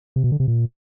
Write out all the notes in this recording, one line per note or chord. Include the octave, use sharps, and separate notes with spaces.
C3
B2
D3
C3
A#2